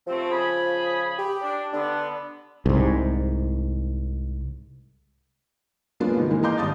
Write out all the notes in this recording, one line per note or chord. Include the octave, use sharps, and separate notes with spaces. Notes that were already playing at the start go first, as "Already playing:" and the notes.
C3 F3 A3 C4
C#3 G#4 B5
G4
D4
D3 B3 D4
C2 G#2
F#3 G#3 A#3 B3 D4 F4
G#2 C3 D#3 F3
E3 G#3 A#3
D#5 F5 A#5 C6 D6 G6
G#1 G2 A5 D#6 G6 A6